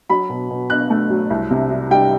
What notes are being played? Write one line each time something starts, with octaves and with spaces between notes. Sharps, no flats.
F#3 B5
B2
B2
B2 F#6
A3
F#3
C2
C3
G3
G3 G5